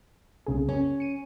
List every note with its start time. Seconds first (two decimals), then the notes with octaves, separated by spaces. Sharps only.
0.46 C2 C#3 G#4
0.69 C#4
1.00 C#7 D#7